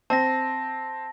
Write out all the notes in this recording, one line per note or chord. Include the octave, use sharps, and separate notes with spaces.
C4 A5 A#6